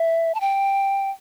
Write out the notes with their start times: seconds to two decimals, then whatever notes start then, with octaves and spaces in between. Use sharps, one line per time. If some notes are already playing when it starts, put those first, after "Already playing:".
Already playing: E5
0.34 A5
0.41 G5